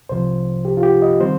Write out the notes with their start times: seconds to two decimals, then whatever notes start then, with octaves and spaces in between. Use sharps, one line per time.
0.09 C2 C3 F3 C5
0.65 G4
0.77 F4
0.83 G4
1.02 D#5
1.21 D#3 G3 C4 C5